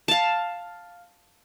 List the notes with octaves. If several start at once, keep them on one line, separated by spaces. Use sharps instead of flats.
F5 A5